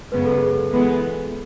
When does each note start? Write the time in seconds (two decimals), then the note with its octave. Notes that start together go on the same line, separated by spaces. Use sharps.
0.12 F#2 C#3 G#3 B3 B4
0.25 A4
0.38 G#4
0.51 A4
0.70 E3 G#3 B3